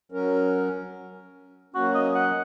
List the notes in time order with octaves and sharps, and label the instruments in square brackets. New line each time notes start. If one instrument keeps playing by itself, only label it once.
[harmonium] F#3 C#4 A#4
[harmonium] F#3 A#3 C#4 [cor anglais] F#4
[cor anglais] D#5
F#5